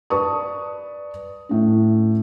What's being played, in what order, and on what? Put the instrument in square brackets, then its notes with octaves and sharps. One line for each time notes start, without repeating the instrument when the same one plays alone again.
[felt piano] B4 D5 A5 C#6 D#6
A2 C#4